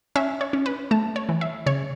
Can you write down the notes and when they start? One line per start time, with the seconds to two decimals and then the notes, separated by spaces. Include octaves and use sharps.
0.16 C#4 E5
0.41 C#5
0.53 C#4
0.66 B4
0.91 A3 A5
1.16 C#5
1.29 E3
1.41 E5
1.66 C#3 C#5